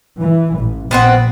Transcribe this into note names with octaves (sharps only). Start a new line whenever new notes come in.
E3
A1
A#1 B3 C4 F#5